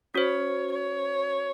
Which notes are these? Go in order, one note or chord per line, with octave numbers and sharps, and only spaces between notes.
C#4 F#4 C5 C#5
C#5